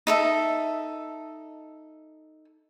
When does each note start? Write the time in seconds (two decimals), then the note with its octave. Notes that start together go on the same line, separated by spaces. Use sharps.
0.07 D#4 A4 E5